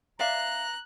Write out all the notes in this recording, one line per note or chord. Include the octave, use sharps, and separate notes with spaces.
D5 E5 F5 A#5 F#6